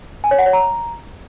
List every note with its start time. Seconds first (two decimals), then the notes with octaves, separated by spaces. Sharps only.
0.24 G#5
0.31 C#5
0.39 F#5
0.46 C#5
0.53 A#5